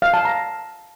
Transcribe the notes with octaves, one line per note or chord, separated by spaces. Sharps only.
F5
A5
A#5